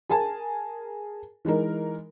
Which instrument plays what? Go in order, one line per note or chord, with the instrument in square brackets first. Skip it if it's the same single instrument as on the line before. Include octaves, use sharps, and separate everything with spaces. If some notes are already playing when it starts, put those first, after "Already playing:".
[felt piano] G#4 A#4 G#5 A5
E3 G#3 D#4 A#4